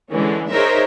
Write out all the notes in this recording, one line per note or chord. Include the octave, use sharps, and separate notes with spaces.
D3 E3 G#3 C#4 D4
D#4 G#4 A#4 C5 C#5 E5